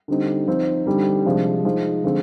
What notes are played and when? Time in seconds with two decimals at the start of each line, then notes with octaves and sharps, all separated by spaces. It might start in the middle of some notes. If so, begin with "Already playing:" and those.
0.08 D3 G3 C4 D#4
0.47 F3 C4 D#4
0.86 D3 G3 C4 D#4
1.26 C3 F3 G#3 D4
1.65 F3 G#3 D#4
2.04 D3 F3 G#3 C4